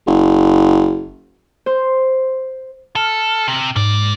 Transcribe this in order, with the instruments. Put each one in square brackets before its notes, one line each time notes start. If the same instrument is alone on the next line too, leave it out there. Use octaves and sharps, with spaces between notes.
[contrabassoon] F#1
[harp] C5
[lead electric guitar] A4 [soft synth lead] F6
[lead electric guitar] C3
[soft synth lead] G#2 [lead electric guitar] A#3 D5